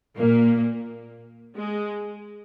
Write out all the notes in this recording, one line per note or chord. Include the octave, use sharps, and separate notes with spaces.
A#2 A#3
G#3